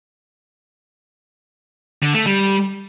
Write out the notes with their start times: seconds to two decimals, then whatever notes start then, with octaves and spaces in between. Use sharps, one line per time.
2.03 D3
2.14 A3
2.26 G3